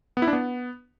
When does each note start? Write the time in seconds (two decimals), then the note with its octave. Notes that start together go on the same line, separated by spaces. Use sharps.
0.17 B3
0.22 E4
0.27 D4
0.33 B3